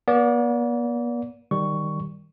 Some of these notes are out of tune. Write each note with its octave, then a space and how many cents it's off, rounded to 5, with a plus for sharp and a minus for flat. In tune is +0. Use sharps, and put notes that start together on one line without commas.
B3 -45 D5 -30
D#3 -5 G3 +0 C#6 +5